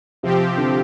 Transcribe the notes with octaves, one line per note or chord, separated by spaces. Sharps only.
C3 F3 C4 G4
D3